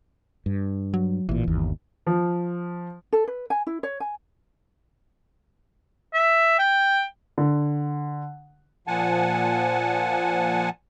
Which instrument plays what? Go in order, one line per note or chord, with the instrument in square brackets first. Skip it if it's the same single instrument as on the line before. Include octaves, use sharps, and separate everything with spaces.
[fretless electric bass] G2
[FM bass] F#3
[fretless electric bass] A1 A#2 [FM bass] E3
[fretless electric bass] G1 D#2
[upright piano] F3
[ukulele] A4
B4
G#5
E4
C#5
G#5
[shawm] E5
G5
[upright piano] D3
[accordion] A#2 F3 F#5 G#5 A5